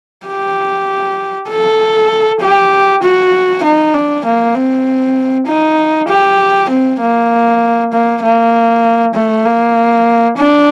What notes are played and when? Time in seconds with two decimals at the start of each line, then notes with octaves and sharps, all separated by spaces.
0.27 G4
1.49 A4
2.40 G4
3.02 F#4
3.63 D#4
3.94 D4
4.25 A#3
4.55 C4
5.47 D#4
6.09 G4
6.69 C4
7.01 A#3
7.92 A#3
8.23 A#3
9.14 A3
9.45 A#3
10.37 D4